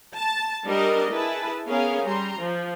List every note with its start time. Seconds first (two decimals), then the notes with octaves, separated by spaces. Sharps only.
0.16 A5
0.66 G3 D4 A#4 D#5
1.12 E4 G#4 B4 A5
1.68 B3 C#4 G#4 A#4 F5
2.04 G3 A#5 C6
2.40 F3